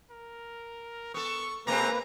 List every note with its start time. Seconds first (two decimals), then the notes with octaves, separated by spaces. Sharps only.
0.10 A#4
1.14 B3 A4 C#6
1.67 B2 G#3 A#3 C4 B4 A#5